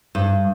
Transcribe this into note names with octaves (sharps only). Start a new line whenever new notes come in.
G2